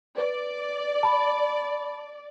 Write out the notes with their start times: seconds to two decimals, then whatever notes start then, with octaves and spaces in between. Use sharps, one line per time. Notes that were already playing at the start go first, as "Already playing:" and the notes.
0.18 B4 D5
1.03 A5 B5